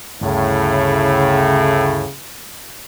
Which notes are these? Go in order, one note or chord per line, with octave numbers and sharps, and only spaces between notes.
G1 D2 A2 C#3